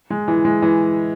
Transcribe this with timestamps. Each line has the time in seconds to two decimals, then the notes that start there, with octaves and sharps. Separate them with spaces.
0.10 G#3
0.28 E3
0.45 G#3
0.62 E3